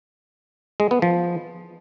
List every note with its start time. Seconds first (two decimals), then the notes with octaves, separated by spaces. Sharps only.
0.80 G#3
0.91 B3
1.02 F3